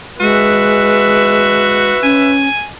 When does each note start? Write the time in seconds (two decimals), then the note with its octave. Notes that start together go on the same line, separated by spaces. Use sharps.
0.20 G#3 F#4 B4 E5
2.03 C#4 G#5